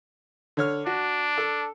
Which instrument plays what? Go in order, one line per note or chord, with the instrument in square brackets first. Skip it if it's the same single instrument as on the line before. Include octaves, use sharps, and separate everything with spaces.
[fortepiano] D3 C#5 F6
[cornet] D4 [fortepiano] F#4
[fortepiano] A4